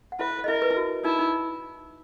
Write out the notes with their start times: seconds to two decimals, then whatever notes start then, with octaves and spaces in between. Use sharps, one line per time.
0.12 F#5
0.19 E4 B4 E5
0.44 D#5
0.48 E4 A#4 E5
0.62 B4
0.71 E4
0.77 F#4
1.05 D#4 E4
1.19 D#4